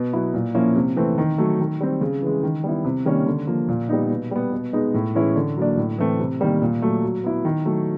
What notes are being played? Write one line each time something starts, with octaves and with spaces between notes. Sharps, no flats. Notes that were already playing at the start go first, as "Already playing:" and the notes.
Already playing: B2
F#3 B3 E4
A#2
F3 A#3 C#4 E4
C3
E3 A3 C4
D#3
F#3 A3
D#3
G3 C4
C#3
E3 G#3
D#3
G3 B3 E4
C3
D#3 G3 A#3 C#4
D3
F3 A#3
A#2
G3 B3 D#4
B2
G3 B3
B2
G#3 B3 D#4
A2
E3 G#3 C#4 E4
D3
F#3 A#3 D4
A2
E3 A3 C4
C3
D#3 G3 A#3
A#2
F#3 A3
F#3
B3 E4
D#3
F#3 A3